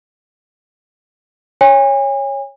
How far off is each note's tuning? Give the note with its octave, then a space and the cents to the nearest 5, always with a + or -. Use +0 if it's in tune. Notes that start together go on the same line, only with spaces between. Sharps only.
C#5 -5 G#5 -35